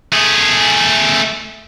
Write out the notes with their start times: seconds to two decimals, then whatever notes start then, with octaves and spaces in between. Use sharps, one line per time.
0.13 A3 G#4